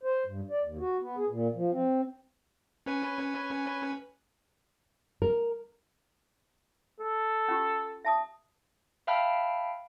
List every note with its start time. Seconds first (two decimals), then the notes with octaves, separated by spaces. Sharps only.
0.03 C5
0.26 G2
0.50 D5
0.64 D#2
0.79 F#4
1.01 B3
1.17 G#4
1.29 A#2
1.55 F3
1.71 C4
2.86 C#4 B4 G#5
5.22 A#4
6.99 A4
7.48 C#4 F4 G4
8.05 E5 A5 D#6
9.07 E5 F5 G5 A5 B5 F6